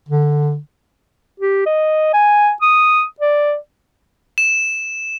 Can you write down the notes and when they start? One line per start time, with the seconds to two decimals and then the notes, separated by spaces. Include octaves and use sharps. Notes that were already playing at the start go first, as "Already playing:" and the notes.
0.08 D3
1.40 G4
1.66 D#5
2.14 G#5
2.62 D#6
3.20 D5
4.38 E7